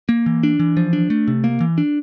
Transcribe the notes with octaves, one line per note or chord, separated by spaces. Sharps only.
A#3
E3
D4
E3
F3
D4
A3
C3
A#3
E3
D4